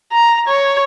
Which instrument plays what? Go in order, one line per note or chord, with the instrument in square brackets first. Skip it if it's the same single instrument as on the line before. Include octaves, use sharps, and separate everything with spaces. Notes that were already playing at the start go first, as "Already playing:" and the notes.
[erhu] A#5
C#5